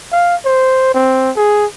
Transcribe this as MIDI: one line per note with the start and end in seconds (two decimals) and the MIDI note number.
0.12 0.36 77
0.45 0.90 72
0.94 1.31 60
1.36 1.66 68